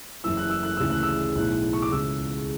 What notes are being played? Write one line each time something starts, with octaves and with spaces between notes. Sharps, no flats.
F#1 F#2 E3 E6
F#6
E6
F#6
D2 C#3 E3 E6
F#6
E6
B1 A2 E3 F#6
C#6
D6
C#2 C#3 E3 E6